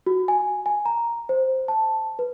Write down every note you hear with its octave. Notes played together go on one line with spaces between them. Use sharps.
F#4
G#5
G#5
A#5
C5
A5
B4